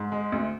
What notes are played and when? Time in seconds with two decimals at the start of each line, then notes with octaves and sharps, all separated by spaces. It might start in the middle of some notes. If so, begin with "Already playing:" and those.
Already playing: G#2
0.12 G#3
0.32 D2